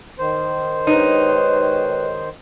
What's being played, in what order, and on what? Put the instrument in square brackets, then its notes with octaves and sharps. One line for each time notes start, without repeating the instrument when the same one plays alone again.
[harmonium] D#3 C5
[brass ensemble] G#3 G4 C#5 [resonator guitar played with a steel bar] D#4 [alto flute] B4